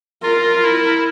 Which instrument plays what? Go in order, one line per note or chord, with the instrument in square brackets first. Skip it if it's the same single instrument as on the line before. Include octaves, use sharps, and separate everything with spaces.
[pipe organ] F4 [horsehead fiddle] A#4
[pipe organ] E4